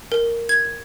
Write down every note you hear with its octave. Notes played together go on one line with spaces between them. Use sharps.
A#4
G#6